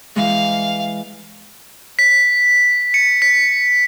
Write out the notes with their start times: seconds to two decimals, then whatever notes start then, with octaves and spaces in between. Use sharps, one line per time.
0.16 E3 G#3 F5
1.99 B6
2.94 C#7
3.22 B6